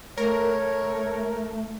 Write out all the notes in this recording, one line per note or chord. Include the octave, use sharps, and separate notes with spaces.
A3 A#4 C#5